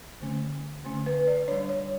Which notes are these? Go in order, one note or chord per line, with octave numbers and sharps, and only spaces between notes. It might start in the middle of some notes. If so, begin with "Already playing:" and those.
D3 A3 C#4
D3 A3 C#4
B4
D5
G3 D4 C#5
C#5